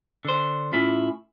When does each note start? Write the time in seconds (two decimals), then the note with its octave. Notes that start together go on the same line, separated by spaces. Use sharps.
0.25 D3 C5
0.73 A2 C#4 E4 F4 E5